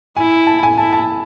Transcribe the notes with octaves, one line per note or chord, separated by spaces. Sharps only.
E4 G#5
A5
G#5
E4 A5
A5